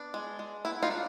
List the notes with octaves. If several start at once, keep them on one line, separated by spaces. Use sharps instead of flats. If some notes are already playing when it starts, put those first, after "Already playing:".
Already playing: B3 D4
G#3
G#3
B3 E4
D#4 F4
D4